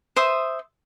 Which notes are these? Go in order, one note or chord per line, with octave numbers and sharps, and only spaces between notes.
C5 E5 D#6